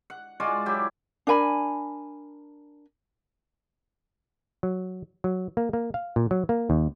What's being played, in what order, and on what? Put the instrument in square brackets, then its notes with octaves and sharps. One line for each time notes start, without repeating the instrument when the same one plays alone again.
[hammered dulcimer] F#5
G#3 F4 F#4 D5
F#3 E4 G4
[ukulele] D4 A#4 G#5 B5
[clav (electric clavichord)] F#3
F#3
A#3
A#3
F5
A#2
F#3
A#3
D#2